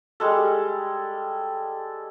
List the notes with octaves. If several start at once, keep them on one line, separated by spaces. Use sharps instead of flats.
G3 G#3 A4